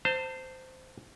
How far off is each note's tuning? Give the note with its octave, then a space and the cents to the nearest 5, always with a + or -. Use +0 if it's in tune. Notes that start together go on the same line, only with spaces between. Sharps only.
C5 -15 A5 +35